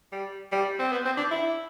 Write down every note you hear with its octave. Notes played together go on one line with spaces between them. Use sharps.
G3
G3
C4
B3
C4
D4
E4